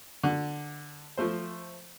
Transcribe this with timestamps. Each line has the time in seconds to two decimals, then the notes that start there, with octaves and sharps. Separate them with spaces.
0.24 D3
1.17 F3 A3 C5